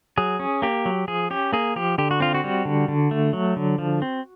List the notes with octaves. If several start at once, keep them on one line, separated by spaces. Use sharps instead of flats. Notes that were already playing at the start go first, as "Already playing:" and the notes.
F#3 G#4
C#4
A#3 G4
F#3
F3 G#4
C#4 G4
A#3 G#4
F3 G4
D3 G4
F#4
C4 F4
F#4
G3
D3
D3
A3
F#3
D3
F3
C4